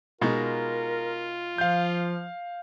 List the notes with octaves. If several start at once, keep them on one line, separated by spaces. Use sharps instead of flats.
B2 G#3 D#4 F4 A#4
F3 F5 G6